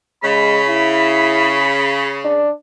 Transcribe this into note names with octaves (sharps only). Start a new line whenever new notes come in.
C#3 G#3 B5
E4
D4